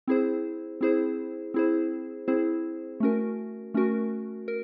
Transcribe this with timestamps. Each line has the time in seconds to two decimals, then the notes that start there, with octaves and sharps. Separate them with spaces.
0.08 C4 E4 G#4 C5
0.81 C4 E4 G#4 C5
1.54 C4 E4 G#4 C5
2.28 C4 E4 G#4 C5
3.00 A3 C#4 F#4 A#4
3.74 A3 C#4 F#4 A#4
4.48 A#4